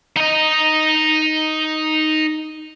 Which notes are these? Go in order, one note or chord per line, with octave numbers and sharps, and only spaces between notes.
D#4 D#5